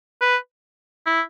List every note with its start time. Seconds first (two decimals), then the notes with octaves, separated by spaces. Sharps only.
0.21 B4
1.07 E4